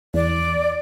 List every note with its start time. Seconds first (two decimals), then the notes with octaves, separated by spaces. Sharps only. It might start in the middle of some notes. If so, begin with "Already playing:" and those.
0.14 E2 D5